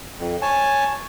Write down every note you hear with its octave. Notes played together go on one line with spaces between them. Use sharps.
F2
C#5 G#5 A5